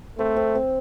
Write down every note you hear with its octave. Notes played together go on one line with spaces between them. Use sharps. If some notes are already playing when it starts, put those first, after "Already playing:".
A3 C4
C4
C4